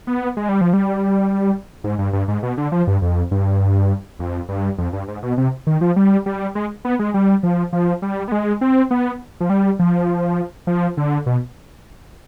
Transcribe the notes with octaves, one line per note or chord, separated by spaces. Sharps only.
B3
G#3
G3
F3
G3
G#2
G2
G2
G#2
B2
D3
F3
G2
F2
G2
F2
G2
F2
G2
G#2
B2
C3
D#3
F3
G3
G3
G#3
B3
G#3
G3
F3
F3
G3
B3
G#3
C4
B3
F3
G3
F3
F3
D3
B2